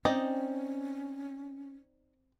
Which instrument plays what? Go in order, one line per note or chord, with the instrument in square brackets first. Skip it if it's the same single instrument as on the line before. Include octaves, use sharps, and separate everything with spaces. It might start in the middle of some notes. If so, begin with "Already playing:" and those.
[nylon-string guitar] C4 [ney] C#4 [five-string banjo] D#4 D5 D#5